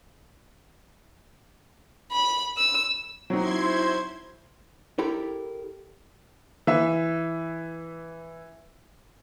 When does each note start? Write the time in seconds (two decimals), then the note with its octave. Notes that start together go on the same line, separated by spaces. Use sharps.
2.12 B5
2.57 E6
3.30 F#3 C4 D#4 E4 C6 G#6
3.60 C5
4.98 E4 G4 A4 A#4 G5 B5
6.67 E3 E5